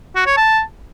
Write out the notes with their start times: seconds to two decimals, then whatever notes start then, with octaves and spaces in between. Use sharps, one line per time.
0.15 F#4
0.26 C#5
0.37 A5